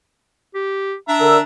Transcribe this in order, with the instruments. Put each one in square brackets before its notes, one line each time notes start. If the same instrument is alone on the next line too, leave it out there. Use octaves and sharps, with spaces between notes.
[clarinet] G4
[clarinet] D4 [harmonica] E5 A#5
[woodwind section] D3 E6 [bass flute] A#4